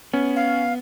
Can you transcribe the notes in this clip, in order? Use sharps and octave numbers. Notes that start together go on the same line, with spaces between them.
B3 C#4
F5